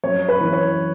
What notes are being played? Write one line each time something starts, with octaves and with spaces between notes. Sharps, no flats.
F#2 C#5
B4
E3
C#5